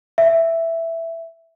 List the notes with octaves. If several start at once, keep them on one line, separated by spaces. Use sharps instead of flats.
E5